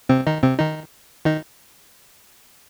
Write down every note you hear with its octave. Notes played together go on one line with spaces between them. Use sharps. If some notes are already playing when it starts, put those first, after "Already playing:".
C3 C4
D#3 D#4
C3 C4
D#3 D#4
D#3 D#4